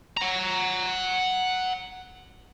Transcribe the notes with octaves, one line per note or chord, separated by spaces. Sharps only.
F#5 A#5